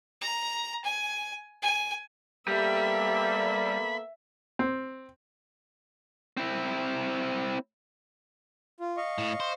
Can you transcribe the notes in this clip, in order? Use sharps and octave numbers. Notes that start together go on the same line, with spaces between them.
A#5
G#5
G#5
G3 A#3 B3 A4 E5 B5
C4
C4 E4
F4
D#5 F5 C#6
A2
C5